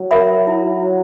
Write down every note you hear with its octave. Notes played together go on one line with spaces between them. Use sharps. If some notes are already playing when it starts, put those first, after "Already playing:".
Already playing: F#3
A#4 E5 B5
E4